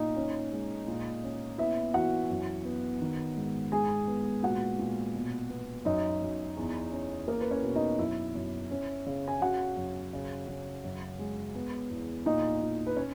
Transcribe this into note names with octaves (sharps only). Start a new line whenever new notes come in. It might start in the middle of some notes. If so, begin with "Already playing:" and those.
Already playing: A#2 D#4 D#5
C#4
G#3
A#2
C#4
B3 E4 E5
E3 F#4 F#5
F#2
B3
D#3
G#2
G#2 G#4 G#5
B3
A#2 F#4 F#5
A#2
B2
B3
F#2 D#4 D#5
F#2
E2
C#4
A#3 A#4
B4
C#4 C#5
B2
D#4 D#5
F#2 E4 E5
F#2
C#4
C#3
G#5
C#3 F#4 F#5
F#2
C#3
C#3
F#2
G#3
B3
E2
A#2 D#4 D#5
A#2
B4
C#4 C#5